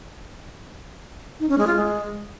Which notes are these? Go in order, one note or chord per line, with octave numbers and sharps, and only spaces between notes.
D#4
C#4
G#3
F4
G#3